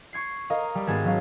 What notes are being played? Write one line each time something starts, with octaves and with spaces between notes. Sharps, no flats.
C#6 G#6 C7
A#4 D#5 F5
G3
G#1 G#3 B3 G#4 A5 G#6
F#3 C#4 F5